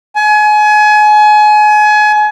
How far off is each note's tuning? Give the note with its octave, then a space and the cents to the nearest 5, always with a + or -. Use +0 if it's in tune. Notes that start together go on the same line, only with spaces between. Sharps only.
G#5 +30